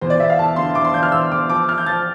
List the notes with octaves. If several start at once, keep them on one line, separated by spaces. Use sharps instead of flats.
E2 C5
D5
E2 E5
F5
E2 A5
D3 C6
E2 D6
C6
E2 G6
F6
E2 E6
E2 D6
F3 D6
F3 F6
G6
F3 A6